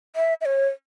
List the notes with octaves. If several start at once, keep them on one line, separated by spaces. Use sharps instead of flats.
E5
E5
C#5